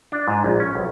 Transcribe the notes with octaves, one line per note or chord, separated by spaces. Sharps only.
D4
G#2
A#1
C#4
B1